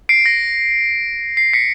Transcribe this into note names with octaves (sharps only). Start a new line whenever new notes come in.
C7 D7
A#6
C7
B6 C#7